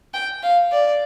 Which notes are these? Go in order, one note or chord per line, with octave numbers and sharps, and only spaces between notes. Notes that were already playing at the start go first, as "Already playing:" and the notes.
G5
F5
D5